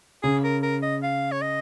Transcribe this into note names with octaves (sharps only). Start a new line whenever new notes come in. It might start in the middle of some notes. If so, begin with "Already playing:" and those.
C#3 G#4
A#4
A#4
D#5
F5
C#5
D#5